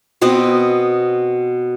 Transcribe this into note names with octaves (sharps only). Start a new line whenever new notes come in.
B2 C4 B4 D#5